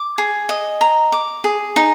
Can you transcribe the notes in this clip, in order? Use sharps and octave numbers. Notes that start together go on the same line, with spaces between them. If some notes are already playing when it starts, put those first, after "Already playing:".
Already playing: D6
G#4
D#5
A#5
D6
G#4
D#4